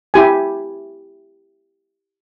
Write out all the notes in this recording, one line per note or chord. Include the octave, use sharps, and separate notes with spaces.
E4 G4 G#5